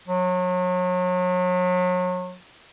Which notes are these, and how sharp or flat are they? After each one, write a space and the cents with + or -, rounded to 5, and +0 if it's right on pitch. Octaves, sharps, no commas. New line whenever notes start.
F#3 -35